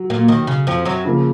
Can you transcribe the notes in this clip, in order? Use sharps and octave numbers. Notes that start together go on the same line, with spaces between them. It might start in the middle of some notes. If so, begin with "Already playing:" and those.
Already playing: F#3
A#2 A#3
D#2 D#3
C#3
F2 F3
F#2 F#3
C#3 F3 A#3